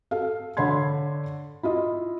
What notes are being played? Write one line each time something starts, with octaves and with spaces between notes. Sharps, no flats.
A4 F5
D3 C#5 B5 C6 G#6
E4 F4 D#5